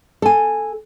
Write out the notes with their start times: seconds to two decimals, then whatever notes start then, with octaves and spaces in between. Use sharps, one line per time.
0.22 A4 G#5